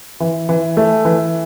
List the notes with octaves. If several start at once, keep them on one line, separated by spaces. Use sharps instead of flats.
E3
E3
A3
E3